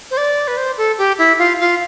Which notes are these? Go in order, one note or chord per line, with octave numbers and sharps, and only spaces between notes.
C5
D5
B4
C5
A4
G4
E4
F4
F4